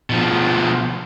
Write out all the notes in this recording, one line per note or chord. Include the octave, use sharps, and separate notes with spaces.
B2 F3